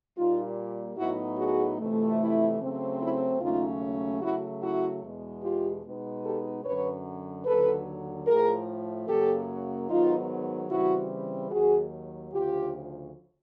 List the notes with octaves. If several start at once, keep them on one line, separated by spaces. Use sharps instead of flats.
A#2 G3 A#3 D#4 F4
A2 F#3 B3 D#4 E4 F#4
F#4 G#4
F2 C3 E3 A3
E4
C#3 F#3 A3 C4
E4
D#2 C#3 F#3 A3 C#4 D#4 F4
C#3 F#3 A3 E4 F#4
E4 F#4
E2 B2 G#3
F4 G4
B2 G#3 B3 D#4
G4 A4
F#2 D3 F#3 B4 C#5
D#2 D3 F#3 A4 B4
A2 F3 A3 G#4 A#4
F#2 C#3 F#3 A#3 G4 A4
G#2 D#3 F#3 B3 D#4 F4
C#3 E3 G3 C4 E4 F#4
D#2 D#3 F#3 F#4 G#4
D2 C#3 F3 F4 G4